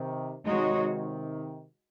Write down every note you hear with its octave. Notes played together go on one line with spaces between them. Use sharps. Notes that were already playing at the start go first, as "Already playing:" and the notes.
Already playing: C3 D#3
C3 D#3 G#3 D#4 F#4 C#5